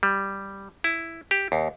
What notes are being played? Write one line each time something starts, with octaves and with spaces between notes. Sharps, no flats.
G3
E4
G4
D#2